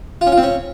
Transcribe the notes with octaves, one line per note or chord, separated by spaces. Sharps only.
F4
C#4
F4
C4
C#4